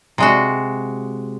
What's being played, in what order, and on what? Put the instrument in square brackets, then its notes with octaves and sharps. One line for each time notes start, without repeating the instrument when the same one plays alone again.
[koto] C3 G#3 F#4